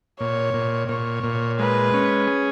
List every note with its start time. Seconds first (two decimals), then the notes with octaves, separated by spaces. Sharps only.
0.19 A#2 C#5
0.54 A#2
0.89 A#2 C#5
1.23 A#2
1.59 G#3 B4
1.94 C#4
2.28 G#4